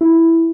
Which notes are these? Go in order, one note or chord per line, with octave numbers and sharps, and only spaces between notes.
E4